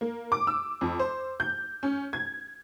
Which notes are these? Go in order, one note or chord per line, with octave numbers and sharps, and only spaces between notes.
A#3
D6
E6
F2
C5
G6
C#4
G#6